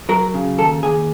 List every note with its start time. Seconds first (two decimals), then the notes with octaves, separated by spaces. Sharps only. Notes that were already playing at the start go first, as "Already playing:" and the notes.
0.09 F#3 A#4
0.34 C#3
0.58 D#2 A4
0.83 D#2 G#4